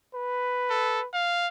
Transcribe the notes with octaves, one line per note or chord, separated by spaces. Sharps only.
B4
A4
F5